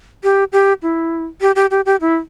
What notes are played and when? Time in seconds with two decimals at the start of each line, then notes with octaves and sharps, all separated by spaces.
0.23 G4
0.52 G4
0.82 E4
1.41 G4
1.56 G4
1.71 G4
1.86 G4
2.01 E4